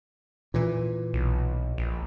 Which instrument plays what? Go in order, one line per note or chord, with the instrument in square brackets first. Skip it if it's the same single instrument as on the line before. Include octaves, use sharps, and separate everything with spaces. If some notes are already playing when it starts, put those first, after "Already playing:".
[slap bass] A#2 E3
[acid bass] B1
A#1